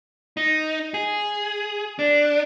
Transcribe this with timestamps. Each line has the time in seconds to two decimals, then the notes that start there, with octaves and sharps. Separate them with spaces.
0.37 D#4
0.94 G#4
1.99 D4